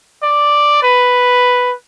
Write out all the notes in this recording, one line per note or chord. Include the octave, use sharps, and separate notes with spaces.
D5
B4